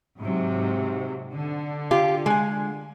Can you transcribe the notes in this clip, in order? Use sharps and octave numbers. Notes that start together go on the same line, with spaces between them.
G#2 C3 F#3
D3
F4 G4
G#3 G#5